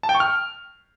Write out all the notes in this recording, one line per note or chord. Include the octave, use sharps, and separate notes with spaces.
A5
G5
C#6
F6